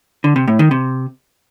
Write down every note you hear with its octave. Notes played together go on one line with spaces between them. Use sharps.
D3
C3
A2
D#3
C3